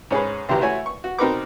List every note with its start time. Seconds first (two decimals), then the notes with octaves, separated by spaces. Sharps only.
0.11 G#2 C#4 G#4 B4
0.49 G#1 C#2 E3 G4 A#5
0.61 A3 E4 F#4 C#5 G#5
0.86 C#6
1.04 F#4
1.18 B2 C4 D#4 A#4 B4 D6